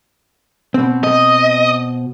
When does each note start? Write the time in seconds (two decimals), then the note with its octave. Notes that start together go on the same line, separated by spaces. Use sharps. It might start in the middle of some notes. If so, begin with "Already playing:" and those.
0.74 B2 C4
1.04 D#5